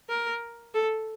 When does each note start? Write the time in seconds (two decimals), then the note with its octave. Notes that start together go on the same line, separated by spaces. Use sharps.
0.09 A#4
0.74 A4